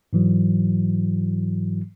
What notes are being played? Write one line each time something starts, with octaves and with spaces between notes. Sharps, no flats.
G#2 E3 F#3